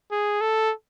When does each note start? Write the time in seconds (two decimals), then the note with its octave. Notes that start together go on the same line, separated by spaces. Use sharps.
0.12 G#4
0.41 A4